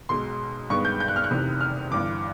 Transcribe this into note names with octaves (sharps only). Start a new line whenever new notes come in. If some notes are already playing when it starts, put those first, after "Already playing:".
B1 B2 G#3 C6
G2 D#3 G#3 B3 C#6
G6
G6
F#6
F6
F#6
F1 E2 C3 D#3
F6
G1 G2 E3 D6